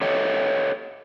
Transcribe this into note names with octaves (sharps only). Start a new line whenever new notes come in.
G4 A4 C#5 D#5 E5 G5